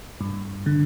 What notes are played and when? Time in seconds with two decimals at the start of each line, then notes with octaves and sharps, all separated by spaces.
0.21 G2
0.66 D3